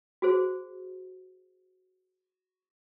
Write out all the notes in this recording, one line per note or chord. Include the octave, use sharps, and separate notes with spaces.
F#4 G#4 C5